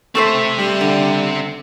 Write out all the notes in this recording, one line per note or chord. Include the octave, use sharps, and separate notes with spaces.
A3 C4 A4 C5 E5
G3
D3